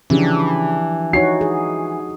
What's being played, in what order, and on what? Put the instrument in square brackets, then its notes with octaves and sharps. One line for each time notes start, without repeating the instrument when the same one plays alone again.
[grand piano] C#3 [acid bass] E3 [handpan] F3 D4 G4
[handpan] D#4 F#4 [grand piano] C#5 C7
[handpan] G#4